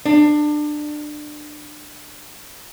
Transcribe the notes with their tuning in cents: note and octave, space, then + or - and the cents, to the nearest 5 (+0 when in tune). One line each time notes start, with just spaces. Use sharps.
D4 +25